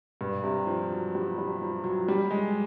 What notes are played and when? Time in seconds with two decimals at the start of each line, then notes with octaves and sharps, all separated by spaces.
0.21 G2
0.44 C3
0.67 F3
0.92 F#3
1.15 G3
1.38 G3
1.62 F3
1.84 F#3
2.08 G3
2.31 G#3